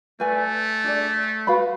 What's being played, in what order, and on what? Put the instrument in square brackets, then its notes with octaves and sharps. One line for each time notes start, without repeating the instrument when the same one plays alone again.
[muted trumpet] A3 [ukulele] B4 D5 G#5
[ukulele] D4 G#4 D5
F#4 B4 F5 B5